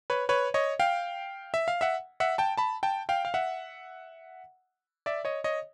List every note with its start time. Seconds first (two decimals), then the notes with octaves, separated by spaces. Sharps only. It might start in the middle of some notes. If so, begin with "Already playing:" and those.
0.10 B4 C#5
0.29 B4 C#5
0.54 C#5 D#5
0.79 F5 G5
1.54 E5
1.68 F5
1.81 E5 F#5
2.20 E5 F#5
2.38 G5 A5
2.57 A5 B5
2.83 G5 A5
3.09 F5 G5
3.25 F5
3.34 E5 F#5
5.06 D5 E5
5.25 C#5 D#5
5.44 C#5 D#5